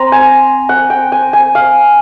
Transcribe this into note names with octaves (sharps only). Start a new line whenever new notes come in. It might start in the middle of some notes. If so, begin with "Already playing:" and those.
Already playing: C4 A#5 C6
G#5
F#5
G5
G#5
G#5
F5